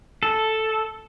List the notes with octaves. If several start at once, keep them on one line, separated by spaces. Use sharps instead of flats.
A4